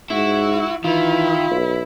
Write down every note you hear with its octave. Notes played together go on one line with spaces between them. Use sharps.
G#2 E4 F#4
D#3 E3 E4 F4
B1